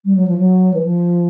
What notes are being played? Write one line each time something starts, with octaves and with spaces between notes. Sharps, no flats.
G3
F#3
F3
F#3
E3
F3